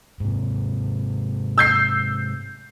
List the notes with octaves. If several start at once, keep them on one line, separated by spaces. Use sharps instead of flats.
G#2 C3
E6 G6 C7